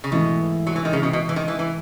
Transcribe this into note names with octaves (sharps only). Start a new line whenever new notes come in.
C#3
G#2 B2 E3 A3 E4
F#3
E3
D#3
C#3
B2
B2
E3
D#3
E3
E3